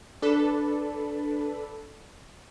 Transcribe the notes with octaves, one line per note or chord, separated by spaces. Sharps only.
D4 A4 B4